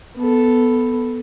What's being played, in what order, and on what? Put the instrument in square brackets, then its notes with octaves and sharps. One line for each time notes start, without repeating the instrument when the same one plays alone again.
[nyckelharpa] B3 A4